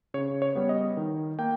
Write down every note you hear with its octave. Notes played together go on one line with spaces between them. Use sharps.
C#3 C#5
C#5
G3 B3
D#5
D#3
A#3 G5